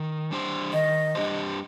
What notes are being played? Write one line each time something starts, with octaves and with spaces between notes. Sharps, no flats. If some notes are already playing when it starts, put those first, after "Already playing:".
Already playing: D#3
G3 D4 G4 C5
D#3 D#5
G3 D4 G4 C5